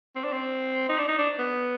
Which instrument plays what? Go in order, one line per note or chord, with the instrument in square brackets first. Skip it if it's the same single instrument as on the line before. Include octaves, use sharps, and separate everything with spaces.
[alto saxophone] C4
D4
C4
D#4
D4
D#4
D4
B3